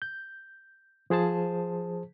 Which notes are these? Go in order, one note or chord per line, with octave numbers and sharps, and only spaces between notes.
G6
F3 G#4 C5 A5